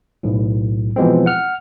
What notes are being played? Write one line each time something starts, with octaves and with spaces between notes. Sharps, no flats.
B1 A2
B2 E3 F3 G#3 B3 C4
F#5 F6